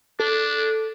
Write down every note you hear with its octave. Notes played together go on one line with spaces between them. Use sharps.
D4 A4